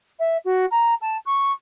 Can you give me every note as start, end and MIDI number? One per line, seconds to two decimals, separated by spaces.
0.19 0.37 76
0.45 0.66 66
0.71 0.94 82
1.01 1.17 81
1.26 1.52 85